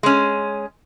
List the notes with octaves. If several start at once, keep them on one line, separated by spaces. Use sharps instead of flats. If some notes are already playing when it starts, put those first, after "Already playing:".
G#3 C#4